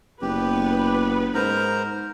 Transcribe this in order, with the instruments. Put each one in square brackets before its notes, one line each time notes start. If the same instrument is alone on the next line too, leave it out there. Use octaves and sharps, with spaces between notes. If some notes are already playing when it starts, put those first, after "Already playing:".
[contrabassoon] F#1 [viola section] B3 B4 [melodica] G4
[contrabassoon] G#2 [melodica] A#4 C5 A#5